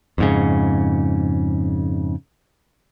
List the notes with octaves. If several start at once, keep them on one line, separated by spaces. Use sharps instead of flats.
F2 G#2 C#3